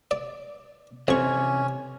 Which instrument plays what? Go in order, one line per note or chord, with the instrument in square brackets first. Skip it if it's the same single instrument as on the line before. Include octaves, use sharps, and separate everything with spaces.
[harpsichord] D5
[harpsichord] F2 C#6 [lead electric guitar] C3 E3 [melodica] C#4